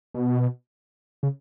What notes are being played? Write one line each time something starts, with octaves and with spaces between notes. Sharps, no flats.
B2
C#3